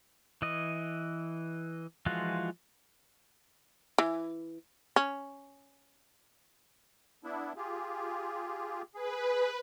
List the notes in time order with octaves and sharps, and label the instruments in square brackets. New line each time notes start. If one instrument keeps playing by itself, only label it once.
[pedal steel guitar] E3 D#5
E3 F3 G#3 F4 F#4
[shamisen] E3
C#4
[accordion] B3 D4 E4
F4 G4 G#4
[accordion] G#4 [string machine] B4